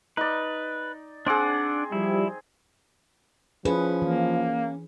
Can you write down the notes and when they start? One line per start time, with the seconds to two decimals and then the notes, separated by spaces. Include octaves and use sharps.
0.17 D#4 B4 D5
1.26 C4 D4 G#4 D5 F#5
1.92 F3 G3 E4
3.65 F3 C#4 E4 G#4 B4
4.02 E3 A#3